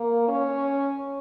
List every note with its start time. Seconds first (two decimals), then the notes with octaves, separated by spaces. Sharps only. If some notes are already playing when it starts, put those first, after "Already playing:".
Already playing: A#3
0.29 C#4